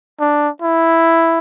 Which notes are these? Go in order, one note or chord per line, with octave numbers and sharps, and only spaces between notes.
D4
E4